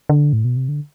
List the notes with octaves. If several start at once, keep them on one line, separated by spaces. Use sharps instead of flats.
D3
A2
B2
C3
D3